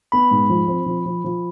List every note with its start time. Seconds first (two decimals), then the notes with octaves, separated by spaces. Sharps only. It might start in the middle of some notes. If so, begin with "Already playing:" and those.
0.12 B3 B5
0.31 G#2
0.50 F3
0.68 C4
0.86 F3
1.06 F3
1.24 F3